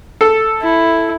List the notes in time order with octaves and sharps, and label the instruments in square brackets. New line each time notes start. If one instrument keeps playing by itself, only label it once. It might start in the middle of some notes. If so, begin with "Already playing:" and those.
[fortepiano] A4
[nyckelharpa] E4